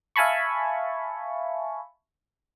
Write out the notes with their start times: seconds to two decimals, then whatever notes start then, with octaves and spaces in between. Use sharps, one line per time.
0.16 E5 F5 G#5 A5 B5 C#6